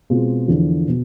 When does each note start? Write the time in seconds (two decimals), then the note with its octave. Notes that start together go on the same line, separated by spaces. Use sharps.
0.10 B2 G#3 C4 F4
0.48 E2 D3 F3
0.88 B2